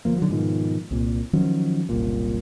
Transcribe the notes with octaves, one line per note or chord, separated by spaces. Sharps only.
D2 F3 A#3
D3 F#3
G#2 B2 D#3 F3
C2 A#2
D#3 F3 F#3 C#4
F#1 C2 A#2